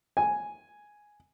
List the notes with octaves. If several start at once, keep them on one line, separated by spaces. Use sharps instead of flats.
G#5